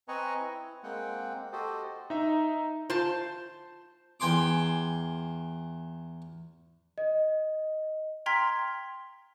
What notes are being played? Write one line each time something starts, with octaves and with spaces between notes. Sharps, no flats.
C4 B4 D#5 G#5 A#5 C#6
E4
G#3 A#3 C4 F#5 G5
F#4 G4 A4 C5 D#5
D#4 E5
F4 C5 A5
E2 G5 G#5 C6 D6
D#5
G5 A#5 C6 F6 G#6 B6